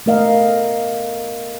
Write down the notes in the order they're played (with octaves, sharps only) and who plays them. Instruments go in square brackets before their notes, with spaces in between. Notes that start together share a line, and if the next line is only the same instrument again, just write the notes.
[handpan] A3 B3 A#4 D#5 F5